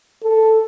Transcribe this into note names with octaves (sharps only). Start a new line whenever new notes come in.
A4